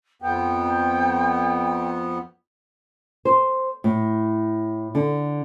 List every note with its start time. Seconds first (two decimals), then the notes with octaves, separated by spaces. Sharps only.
0.22 F2 B3 G5
3.25 C5
3.84 A2
4.95 D3